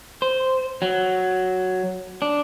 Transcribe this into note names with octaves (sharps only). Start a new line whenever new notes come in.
C5
F#3
D4